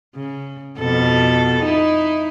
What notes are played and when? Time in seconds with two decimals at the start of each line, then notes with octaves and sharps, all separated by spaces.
0.15 C#3
0.78 F2 B2 A4
1.64 D#4 E4